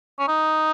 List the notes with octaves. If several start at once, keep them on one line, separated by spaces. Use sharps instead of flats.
C#4
D#4